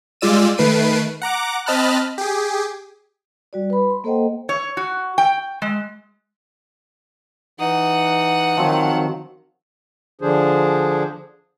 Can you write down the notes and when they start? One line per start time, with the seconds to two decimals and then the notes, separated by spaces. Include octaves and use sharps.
0.21 G3 G#3 F4 D5 E6 D#7
0.57 D#3 A3 B4 C7 D7 D#7
1.22 F#5 A#5 D6
1.66 C4 D#5 A5 B5 F6 F#6
2.18 G4 G#4
3.53 G3 F#4 D5
3.70 B4 B5
3.90 C6
4.04 A#3 A4 C5 D#5 F#5 G5
4.49 C#5
4.77 F#4
5.18 G5
5.62 G#3
7.59 E3 D#4 F#5 D#6
8.57 D#3 F3 F#3 C4
10.21 D3 F3 D4 G#4 C5